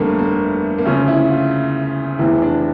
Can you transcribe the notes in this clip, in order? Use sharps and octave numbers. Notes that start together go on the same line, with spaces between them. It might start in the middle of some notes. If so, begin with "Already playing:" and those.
Already playing: G1 F2 D3 G3 A3 A#3
A#3
A#3
D2 C#3 F3 C#4
E4
F4
F1 E2 E3 E4
D4